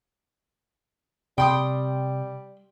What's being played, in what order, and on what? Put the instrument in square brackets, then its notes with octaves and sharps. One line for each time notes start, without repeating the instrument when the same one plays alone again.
[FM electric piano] C3 [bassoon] G3 [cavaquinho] G5 C6 D#6